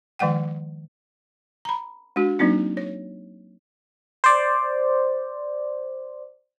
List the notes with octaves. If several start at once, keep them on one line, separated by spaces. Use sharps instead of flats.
D#3 F3 G#3 F#5 G5
A#5 B5
G#3 D4 F#4
F#3 A#3 C4 D4 D#4
C#5
C5 D5